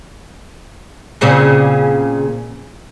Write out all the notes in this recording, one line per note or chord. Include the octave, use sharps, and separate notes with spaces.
A#2 C#3 C4